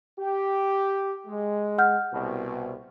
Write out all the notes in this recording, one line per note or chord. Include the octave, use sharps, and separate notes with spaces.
G4
G#3
F#5 F6 G6
C2 B2